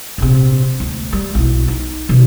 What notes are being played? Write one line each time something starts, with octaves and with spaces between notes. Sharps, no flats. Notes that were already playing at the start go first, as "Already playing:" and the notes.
A#1 C3
D2
G3
B1 E4
D#4
B2 D#3